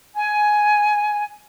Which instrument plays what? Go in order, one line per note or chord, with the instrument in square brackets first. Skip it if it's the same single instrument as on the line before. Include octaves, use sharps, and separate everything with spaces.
[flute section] G#5